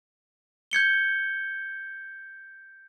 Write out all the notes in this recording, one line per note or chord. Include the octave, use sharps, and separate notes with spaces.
G6 G#6 C#7 G7